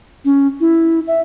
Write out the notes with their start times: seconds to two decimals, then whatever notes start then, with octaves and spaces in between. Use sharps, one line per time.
0.25 C#4
0.60 E4
1.07 E5